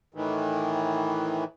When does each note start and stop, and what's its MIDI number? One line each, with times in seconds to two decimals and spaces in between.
0.14 1.44 45
0.14 1.44 51
0.14 1.44 52